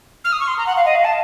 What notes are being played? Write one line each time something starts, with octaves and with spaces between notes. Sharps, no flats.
F6
D#6
C#6
C6
A#5
F#5
F5
D#5
F5
A5